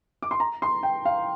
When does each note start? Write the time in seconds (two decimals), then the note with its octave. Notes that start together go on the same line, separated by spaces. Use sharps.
0.22 D6
0.31 C6
0.40 A#5
0.62 C6
0.83 G5
1.05 F5